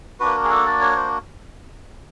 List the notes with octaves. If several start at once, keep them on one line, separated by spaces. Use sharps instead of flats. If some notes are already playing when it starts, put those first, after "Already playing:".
A#3 D4 F#4 B4
A#4
G#4
A4
D5
C#5
C5